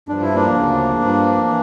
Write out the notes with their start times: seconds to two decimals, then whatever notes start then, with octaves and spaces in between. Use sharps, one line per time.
0.08 G2 F3 D4
0.22 E4
0.35 A#3 D4
0.54 D2 C#3 F3
1.01 G2 F3
1.47 E3